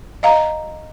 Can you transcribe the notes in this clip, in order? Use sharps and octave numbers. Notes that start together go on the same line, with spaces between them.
D#5 F5 A#5